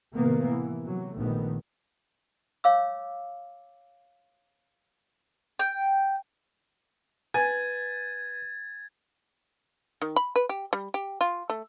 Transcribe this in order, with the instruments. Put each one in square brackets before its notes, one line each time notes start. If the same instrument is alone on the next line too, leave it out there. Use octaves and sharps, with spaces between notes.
[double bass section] A2 C3 D#3 A#3 B3
E3
C3 F#3
A#1 D#3 A3 B3
[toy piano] C#5 F5 D6 E6
[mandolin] G5
[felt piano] B4 [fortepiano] G#5 [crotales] G#6 A6
[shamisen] D#3
B5
B4
G4
G3
G4
F4
A3